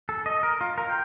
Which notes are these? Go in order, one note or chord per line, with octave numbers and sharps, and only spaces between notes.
A4
D#5
A#4
F4
A#4
G5